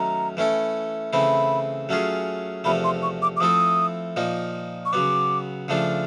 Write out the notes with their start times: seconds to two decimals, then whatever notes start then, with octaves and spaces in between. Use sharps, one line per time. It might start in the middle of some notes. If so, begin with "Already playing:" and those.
Already playing: D#3 F#3 A3 C#4 A#5
0.37 E3 A3 C#4 E4 A4
1.13 C#3 E3 A3 C4 E4 B5
1.89 F#3 A3 C#4 F4 G#4
2.64 E2 C3 F3 A3 B5
2.84 C6
3.03 C#6
3.22 D6
3.37 D6
3.40 F3 A3 C4 E4 A4 D#6
4.16 A#2 F3 A#3 D#4
4.85 C#6
4.92 C#3 F#3 B3 D6
5.68 C#3 F3 A3 D4 F4